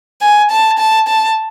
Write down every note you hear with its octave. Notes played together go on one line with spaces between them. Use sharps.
G#5
A5
A5
A5